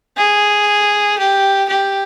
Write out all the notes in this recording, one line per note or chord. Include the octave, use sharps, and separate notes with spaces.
G#4
G4
G4